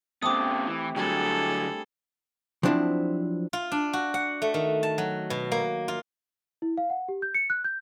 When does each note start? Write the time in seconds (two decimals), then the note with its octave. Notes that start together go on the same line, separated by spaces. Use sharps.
0.23 C#3 A3 B3 C4 G4 D6 D#6
0.67 E3
0.96 D3 F#3 G3 D4 G#4 A4 C#6
2.63 F3 F#3 C4 D4 E4
3.53 F4
3.72 D4
3.93 F#4
4.14 F#5
4.42 A3
4.54 D#3
4.83 A5
4.98 F#3
5.30 B2
5.52 A#3
5.88 F4
6.62 E4
6.78 F5
6.90 F#5
7.09 G4
7.22 G6
7.35 C#7
7.50 F#6
7.64 G6